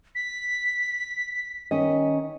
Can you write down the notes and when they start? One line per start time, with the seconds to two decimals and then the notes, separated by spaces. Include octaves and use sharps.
0.15 B6
1.71 D#3 C#4 D#5